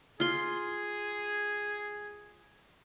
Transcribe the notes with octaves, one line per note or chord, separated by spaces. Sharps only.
F4 G#4 C6